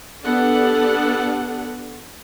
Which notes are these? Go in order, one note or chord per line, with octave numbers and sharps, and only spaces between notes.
B3 D4 G4 A4 F#5